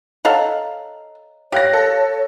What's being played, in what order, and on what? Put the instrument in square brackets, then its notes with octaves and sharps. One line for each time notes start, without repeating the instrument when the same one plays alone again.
[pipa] A4 F5 F#5 [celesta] C#5 D#5 A#5
[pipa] G4 [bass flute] C#5 [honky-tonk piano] F5 F#6 A#6
[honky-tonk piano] A4